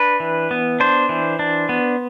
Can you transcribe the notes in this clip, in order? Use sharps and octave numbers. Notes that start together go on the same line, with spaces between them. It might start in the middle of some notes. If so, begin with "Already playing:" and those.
Already playing: D4 B4
E3
B3
D4 C5
E3
D4
B3